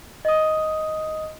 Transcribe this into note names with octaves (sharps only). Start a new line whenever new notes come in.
D#5 D#6